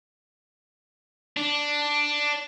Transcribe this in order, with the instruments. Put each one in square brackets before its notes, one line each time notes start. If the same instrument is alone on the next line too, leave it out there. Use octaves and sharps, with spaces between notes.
[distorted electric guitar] D4